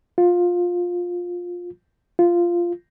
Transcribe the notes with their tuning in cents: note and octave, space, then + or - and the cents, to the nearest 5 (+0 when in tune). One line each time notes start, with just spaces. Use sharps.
F4 +15
F4 -10